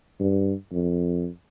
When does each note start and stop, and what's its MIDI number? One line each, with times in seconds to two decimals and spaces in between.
0.20 0.54 43
0.72 1.28 41